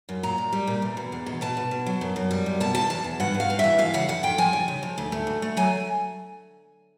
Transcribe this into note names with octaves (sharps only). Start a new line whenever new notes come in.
F#2
A#2 A#5
A#2
G3
A#2
E2
B2
E2
B2
B2 A5
B2
B2
F#3
F#2
F#2
G3
F#2
B2 A5
E2 A5
E2 A5
E2
G2 F#5
G2
F5
G2
E3 E5
F2 F5
C#3 F#5
F2 F#5
F2 G5
F3 G#5
C#3
C#3
F3
D2
A3
D2
A3
F#3 G#5